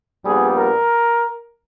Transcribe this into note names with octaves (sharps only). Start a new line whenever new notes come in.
A#1 A#2 G3 B3 G#4
A#4